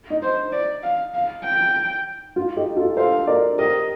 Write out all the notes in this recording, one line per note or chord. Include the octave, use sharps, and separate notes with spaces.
D#4
C5
D5
F5
F5
G5
F4
D#4 G4
F4 A4
A4 C5 F5
A#4 D5
G4 A#4 D#5